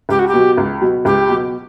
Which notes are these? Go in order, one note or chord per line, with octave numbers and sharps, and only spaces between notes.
C#2 G4
F#4
G4
B2 F#3
C#2
B2 F#3
C#2 G4
B2 F#3